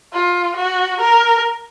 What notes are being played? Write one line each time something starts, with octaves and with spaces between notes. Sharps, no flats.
F4
F#4
A#4